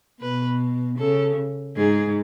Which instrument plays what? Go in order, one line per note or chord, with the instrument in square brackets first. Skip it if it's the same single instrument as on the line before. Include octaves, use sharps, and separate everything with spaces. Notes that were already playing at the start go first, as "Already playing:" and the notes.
[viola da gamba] B2 [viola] B4
[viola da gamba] C#3 [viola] A4
[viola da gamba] G#2 [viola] G#4